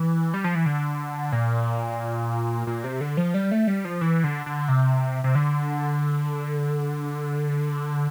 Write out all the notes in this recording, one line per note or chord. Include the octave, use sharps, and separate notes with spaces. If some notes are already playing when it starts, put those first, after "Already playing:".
Already playing: E3
G3
F3
E3
D3
A#2
A#2
C3
D3
F3
G3
A3
G3
F3
E3
D3
D3
C3
C3
D3